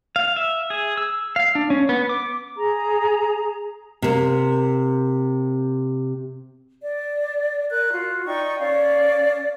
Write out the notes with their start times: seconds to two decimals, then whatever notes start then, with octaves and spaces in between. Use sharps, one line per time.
0.16 F5
0.36 E5
0.70 G#4
0.98 E6
1.36 F5
1.55 D4
1.70 C#4
1.89 B3
2.09 D6
2.56 G#4 A#5
4.02 C3 A#3
6.82 D5
7.70 A#4 F#6
7.92 F4 F#4
8.26 D#4 D5 G5 C#6
8.59 C#4 D5 F5